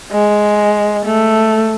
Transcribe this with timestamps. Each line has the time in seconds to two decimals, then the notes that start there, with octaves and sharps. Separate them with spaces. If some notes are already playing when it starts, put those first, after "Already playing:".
0.12 G#3
1.05 A3